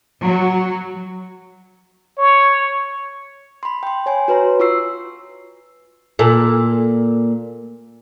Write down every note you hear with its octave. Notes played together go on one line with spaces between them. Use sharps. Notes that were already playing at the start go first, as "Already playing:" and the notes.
F#3
C#5
B5 C6
G5 C6
C#5 G#5 C6
F#4 B4 C#5 A#5
F4 C#6 E6 C7
A#2 A4